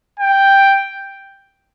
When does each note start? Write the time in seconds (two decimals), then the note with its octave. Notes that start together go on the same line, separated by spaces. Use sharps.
0.19 G5